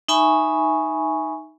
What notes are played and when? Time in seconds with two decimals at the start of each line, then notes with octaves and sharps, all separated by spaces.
0.08 D#4 E5 G#5 B5 C#6